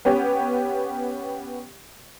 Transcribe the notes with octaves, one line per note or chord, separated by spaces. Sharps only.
B3 C#4 G4